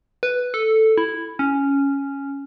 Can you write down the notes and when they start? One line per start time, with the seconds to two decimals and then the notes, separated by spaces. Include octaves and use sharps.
0.23 B4
0.54 A4
0.98 E4
1.39 C#4